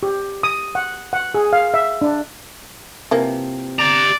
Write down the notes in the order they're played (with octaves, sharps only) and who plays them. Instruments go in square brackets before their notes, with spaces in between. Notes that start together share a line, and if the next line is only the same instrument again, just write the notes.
[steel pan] G4
D#6
F#5
F#5
G#4
F5
E5
D4
[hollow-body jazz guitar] C3 [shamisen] E3 F3 A#3
[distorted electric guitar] G4 A#5 [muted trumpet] D5